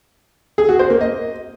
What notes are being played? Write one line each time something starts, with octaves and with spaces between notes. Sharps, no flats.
G#4
F#4
C5
A#3
D#5